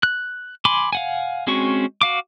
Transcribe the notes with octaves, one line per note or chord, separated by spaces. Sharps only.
F#6
G#5 B5 C6 D6
F5 F#5 G#5
G#3 C4 C#4 F#4 C#6
F#4 F5 D6